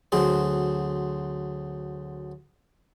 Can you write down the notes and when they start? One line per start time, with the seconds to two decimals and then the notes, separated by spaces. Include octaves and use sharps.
0.12 D2 F#3 G#4 C5